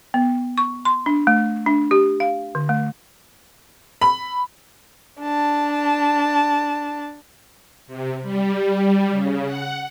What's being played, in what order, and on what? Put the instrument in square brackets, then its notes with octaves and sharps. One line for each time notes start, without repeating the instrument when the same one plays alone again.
[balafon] B3
C#6
C6
D4
A3
D4
G4
F5
D3
A3
[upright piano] B5
[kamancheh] D4 A5
[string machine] C3
G3
C#3
F#5